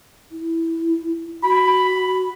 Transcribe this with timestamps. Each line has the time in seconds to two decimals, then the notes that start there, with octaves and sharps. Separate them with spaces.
0.32 E4
1.43 F#4 B5